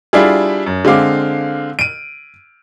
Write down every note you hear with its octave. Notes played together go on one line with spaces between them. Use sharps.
G3 D4 E4 F4 G#4
F#2
D3 G#3 C4 F5 D6
D7 D#7